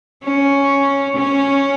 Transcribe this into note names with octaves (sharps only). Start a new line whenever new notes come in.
C#4
C#4